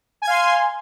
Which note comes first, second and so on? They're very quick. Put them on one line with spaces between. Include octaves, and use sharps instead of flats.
G#5 G#6 F5 C6